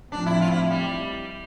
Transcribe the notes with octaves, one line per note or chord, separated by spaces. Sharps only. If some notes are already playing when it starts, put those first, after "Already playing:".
A2 F3 A3 C4 D4
E4
F4
E4
G3